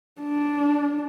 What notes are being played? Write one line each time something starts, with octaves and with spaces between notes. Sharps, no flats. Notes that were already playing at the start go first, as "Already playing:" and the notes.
D4